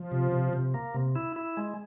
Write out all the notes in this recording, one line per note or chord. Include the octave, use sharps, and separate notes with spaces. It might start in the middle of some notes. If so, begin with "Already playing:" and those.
Already playing: F3
C3
C3
C3
A#3
C3
E4
E4
G#3